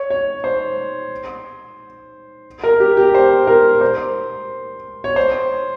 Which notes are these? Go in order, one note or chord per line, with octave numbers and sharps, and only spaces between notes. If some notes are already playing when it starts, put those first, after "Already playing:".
Already playing: C#5
C#5
C5
A#4
G4
G4
C5
A#4
C5
C#5
C5